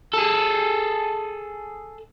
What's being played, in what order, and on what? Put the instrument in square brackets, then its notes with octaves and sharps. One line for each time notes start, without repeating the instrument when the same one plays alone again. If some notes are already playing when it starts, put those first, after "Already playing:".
[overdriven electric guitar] G#4 A4